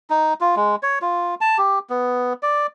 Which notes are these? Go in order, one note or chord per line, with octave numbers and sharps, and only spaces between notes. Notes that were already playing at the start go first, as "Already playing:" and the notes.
D#4
F4
G#3
C#5
F4
A5
G4
B3
D5